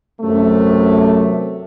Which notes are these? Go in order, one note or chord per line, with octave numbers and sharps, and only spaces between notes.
F#2 C3 A3